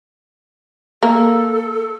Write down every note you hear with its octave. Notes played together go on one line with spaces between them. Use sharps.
A#3 A4